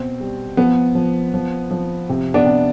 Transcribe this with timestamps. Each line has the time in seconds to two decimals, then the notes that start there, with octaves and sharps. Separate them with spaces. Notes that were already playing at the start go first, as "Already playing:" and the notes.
Already playing: B2 C4
0.20 G3
0.57 F3 B3
0.95 F3
1.34 F3
1.71 F3
2.09 C3
2.34 B3 D4
2.46 C3